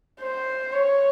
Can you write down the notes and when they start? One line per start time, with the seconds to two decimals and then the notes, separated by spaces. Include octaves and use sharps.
0.21 C5
0.73 C#5